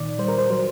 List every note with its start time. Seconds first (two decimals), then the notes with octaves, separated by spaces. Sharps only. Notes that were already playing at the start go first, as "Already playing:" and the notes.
Already playing: A#2 D#3 D5
0.19 G3 C5
0.28 A#4
0.38 C5
0.50 F#3 C5